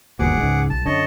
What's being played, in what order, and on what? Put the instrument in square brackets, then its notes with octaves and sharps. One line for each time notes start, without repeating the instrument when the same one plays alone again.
[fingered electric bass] G1 D#2 B2 [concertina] G#4 F#5 D6
[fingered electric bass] C#2 G#2
[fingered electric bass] B1 [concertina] A5
[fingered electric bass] F#2 D3 [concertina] C#5 D#5 A5